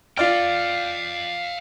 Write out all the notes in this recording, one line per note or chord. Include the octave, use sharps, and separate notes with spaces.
F4 D5 F5 G5 F6